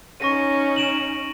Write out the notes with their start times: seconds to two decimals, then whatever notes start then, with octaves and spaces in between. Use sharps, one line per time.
0.20 C#4 D#4 C#6 A#6 D#7
0.76 D7 E7 F#7